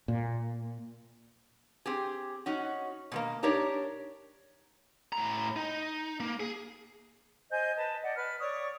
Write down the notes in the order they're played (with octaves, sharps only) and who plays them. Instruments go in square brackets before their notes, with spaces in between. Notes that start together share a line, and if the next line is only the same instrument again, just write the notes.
[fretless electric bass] A#2
[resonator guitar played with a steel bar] C4 G4 G#4
C#4 D#4 F#4
B2 G#3 A#3
D4 D#4 G4 A#4 C#5 D5
[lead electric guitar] A2 A#5
D#4
A#3
G#4
[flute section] C5 D#5 G#5 G6
B4 D#5 A5
D5 D#5 F#5
B4 F6
C#5 D5 C#6 D#6